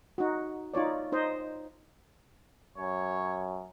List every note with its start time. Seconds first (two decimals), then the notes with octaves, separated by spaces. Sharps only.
0.18 D#4 F#4
0.74 D#4 F4 C#5 D5
1.12 D#4 C5 D#5
2.78 F#2 C#5